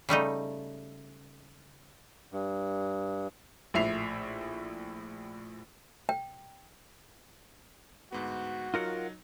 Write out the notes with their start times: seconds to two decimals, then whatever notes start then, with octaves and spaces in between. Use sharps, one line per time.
0.09 C#3 G3 A3 D#4
2.32 G2
3.74 A#1 A2 E5 C7 F7
6.09 G5
8.12 D2 G#2 B3 F#4
8.74 F#3 D#4 F4 A#4 F#5